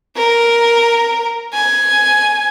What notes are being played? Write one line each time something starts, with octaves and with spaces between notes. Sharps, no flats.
A#4
G#5